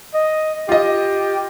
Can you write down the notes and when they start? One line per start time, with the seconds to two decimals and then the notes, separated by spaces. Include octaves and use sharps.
0.14 D#5
0.69 F4 G4 D#5